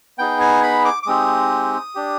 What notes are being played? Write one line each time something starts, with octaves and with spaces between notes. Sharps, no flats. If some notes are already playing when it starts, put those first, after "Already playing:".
B3 D#4 G#4 G5
G#5
B5
D6
D6
G#3 C4 D#4 G4 D#6
D4 G4